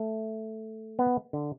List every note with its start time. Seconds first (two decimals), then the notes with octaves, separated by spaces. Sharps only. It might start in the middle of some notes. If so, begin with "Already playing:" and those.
Already playing: A3
0.99 B3
1.33 D3